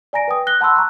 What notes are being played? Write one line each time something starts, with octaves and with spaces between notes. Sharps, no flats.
D5 G#5 A#5 A#6 D7
B4 G5 D#6
F#6 A#6 G7
F#5 A5 B5 C6 E6 F#6
A#5 C#6 F#6